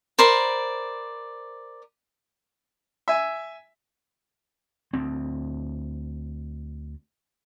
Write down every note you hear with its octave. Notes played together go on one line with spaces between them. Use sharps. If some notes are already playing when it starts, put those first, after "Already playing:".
A#4 C5 D5 B5
E5 G#5
D2 C4